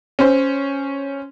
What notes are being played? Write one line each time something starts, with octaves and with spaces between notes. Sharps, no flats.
C#4 C5